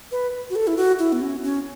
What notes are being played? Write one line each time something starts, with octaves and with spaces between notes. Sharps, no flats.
B4
F#4
A4
E4
F#4
E4
B3
C#4
C#4